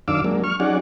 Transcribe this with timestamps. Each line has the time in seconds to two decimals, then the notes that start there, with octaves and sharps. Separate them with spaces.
0.08 F#2 D#3 D4 F5 D6 E6
0.24 F#3 G#3 A#3 D4
0.44 C#6 F6
0.60 F#3 C#4 D#4 G#4 D5 F#5